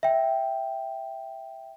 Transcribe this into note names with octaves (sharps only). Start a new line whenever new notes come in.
E5 G5